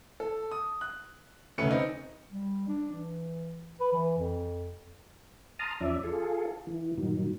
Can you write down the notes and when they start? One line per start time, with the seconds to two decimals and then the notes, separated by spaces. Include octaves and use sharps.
0.20 A4
0.51 D#6
0.81 F#6
1.58 F1 D2 A3 C#4 B4 C#7
1.71 C4 D#4
2.31 G3
2.68 D4
2.92 E3
3.81 B4
3.93 E3
4.18 F2
5.59 A5 A#5 C6 D#6 F6
5.81 E2 F3 C#4 D5 E5
6.04 F4 G#4 A4
6.67 E3
6.98 G2 A#2 D#3 F#3